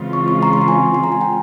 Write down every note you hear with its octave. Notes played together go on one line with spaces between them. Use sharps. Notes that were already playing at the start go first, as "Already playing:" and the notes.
Already playing: C#3 E3 G#3 C4 F4
C#6
C#6
A#5 C#6
C6
C#6
G#5 C6
C6
A#5
G#5
G5 A#5